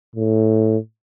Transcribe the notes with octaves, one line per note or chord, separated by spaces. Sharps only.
A2